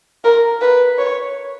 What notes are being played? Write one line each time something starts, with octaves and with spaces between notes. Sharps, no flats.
A#4
B4
C#5